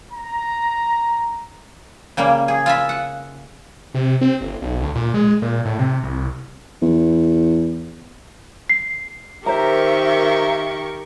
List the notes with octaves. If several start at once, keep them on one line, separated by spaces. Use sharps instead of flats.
A#5
C#3 G3 A#3
G#4
F4 E5 B5
F#5
C3
C4
G1
B1
D2
A#2
G#3
A#2
A2
C3
C2
E2
C7
D#3 G4 A#4 C5 E5 A#5 C#6